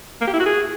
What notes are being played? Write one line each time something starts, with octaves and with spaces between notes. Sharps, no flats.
A#3
G4
E4
F#4
G#4